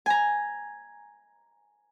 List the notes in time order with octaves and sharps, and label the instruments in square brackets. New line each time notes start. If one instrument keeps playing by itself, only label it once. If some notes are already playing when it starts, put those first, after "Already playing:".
[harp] G#5 A#5